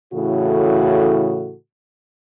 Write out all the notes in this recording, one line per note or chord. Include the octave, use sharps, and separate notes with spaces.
A2 C#3 E3 F#4 A4